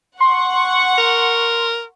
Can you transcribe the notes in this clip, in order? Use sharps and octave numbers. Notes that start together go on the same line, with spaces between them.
F#5 C6 C#6
A#4